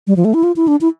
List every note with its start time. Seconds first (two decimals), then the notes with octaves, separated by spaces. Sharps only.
0.07 G3
0.16 F3
0.25 A3
0.34 E4
0.43 F4
0.56 E4
0.68 D4
0.81 E4